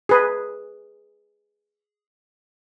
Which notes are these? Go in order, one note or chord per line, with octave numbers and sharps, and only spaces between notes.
G#4 B4